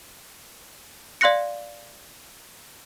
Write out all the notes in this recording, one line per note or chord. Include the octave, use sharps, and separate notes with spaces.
D5 F5 C6 F#6 A#6 C#7